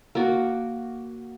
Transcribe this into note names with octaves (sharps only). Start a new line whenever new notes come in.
A#3 F#4